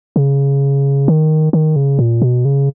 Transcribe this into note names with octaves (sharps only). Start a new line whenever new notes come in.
C#3
D#3
D#3
C#3
A#2
B2
C#3